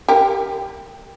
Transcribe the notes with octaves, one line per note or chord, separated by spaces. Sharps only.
G4 A#4